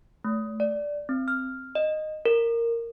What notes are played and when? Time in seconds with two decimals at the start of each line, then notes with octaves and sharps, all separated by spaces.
0.24 A3
0.60 D5
1.09 C4
1.28 F6
1.75 D#5
2.26 A#4